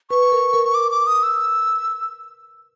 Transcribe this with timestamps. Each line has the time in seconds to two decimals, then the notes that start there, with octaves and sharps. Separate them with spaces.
0.10 B4 C#6
0.32 A#4
0.53 A#4
0.75 D6
0.92 D6
1.07 D#6
1.23 E6